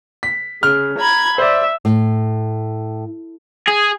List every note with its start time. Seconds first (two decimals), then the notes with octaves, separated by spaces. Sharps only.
0.23 B6
0.63 C#3 F6
0.98 A#5 B5 G#6
1.38 C5 D5 E5
1.85 A2
3.67 G#4